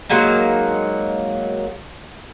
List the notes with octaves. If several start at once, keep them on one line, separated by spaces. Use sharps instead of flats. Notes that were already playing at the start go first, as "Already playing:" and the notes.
F#3 G#3 A#3 D#4